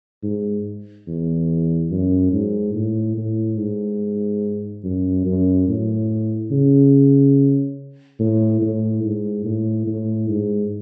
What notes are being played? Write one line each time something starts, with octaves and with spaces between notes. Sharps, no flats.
G#2
E2
F#2
G#2
A2
A2
G#2
F#2
F#2
A2
C#3
A2
A2
G#2
A2
A2
G#2